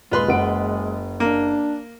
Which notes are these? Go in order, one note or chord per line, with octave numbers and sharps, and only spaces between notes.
D#1 G#3 F4 B4 C6
F#1 F#5 D7
A#3 D4